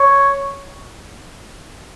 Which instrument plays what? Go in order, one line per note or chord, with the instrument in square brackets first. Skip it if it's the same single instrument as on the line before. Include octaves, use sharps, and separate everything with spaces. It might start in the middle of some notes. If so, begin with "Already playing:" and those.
Already playing: [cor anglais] C#5